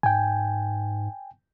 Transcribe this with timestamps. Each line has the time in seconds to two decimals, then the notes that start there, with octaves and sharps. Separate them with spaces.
0.03 G#2 G5 G#5